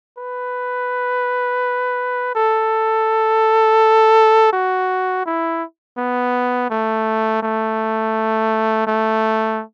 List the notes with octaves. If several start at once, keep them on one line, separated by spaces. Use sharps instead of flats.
B4
A4
F#4
E4
B3
A3
A3
A3